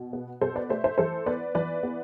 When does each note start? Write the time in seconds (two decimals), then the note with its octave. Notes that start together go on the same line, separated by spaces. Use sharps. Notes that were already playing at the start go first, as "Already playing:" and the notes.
Already playing: B2
0.13 B3
0.41 B2 A4 C5
0.56 B4 D5
0.70 A3 C5 E5
0.84 C5 E5
0.98 E3 A4 C5
1.26 B3 B4 D5
1.55 E3 B4 D5
1.83 B3